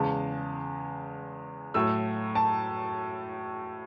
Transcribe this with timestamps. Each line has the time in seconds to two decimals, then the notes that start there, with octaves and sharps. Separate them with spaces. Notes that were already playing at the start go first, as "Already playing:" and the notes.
Already playing: E2 C#3 G#3 A5
1.74 A2 F#3 A3 E6
2.35 A5